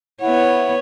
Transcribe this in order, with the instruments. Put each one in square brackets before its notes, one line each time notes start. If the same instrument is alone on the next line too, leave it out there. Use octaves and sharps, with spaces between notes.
[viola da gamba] B3 C#5 [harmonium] E4 F#5